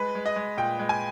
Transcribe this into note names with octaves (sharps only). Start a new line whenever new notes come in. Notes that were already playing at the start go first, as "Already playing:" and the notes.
Already playing: G#3 B4
G#3
D#5
G#3
A#2 G5
G#3
G#5